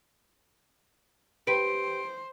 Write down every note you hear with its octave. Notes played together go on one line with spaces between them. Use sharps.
G4 B4 C5 D7